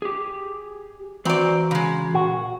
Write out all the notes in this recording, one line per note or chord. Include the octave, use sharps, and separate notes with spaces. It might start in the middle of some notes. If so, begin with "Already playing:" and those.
G4 G#4
E3 C4 F#4 D5 A#5
C#3 G#3
A#2 F#4